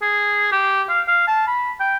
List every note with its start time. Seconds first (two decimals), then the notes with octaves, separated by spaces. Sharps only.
0.02 G#4
0.52 G4
0.89 F5
1.08 F5
1.27 A5
1.47 B5
1.80 G5